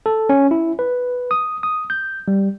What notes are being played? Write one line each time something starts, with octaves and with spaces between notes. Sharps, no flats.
A4
C#4
E4
B4
D#6
D#6
G6
G3